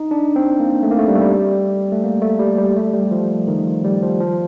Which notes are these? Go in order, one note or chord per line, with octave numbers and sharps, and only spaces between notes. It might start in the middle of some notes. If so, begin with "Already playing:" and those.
Already playing: D#4
D4
C4
A#3
A3
A#3
A3
G3
A3
G3
A3
A#3
A3
G3
G3
A3
G3
F3
D#3
F3
G3
F3
F3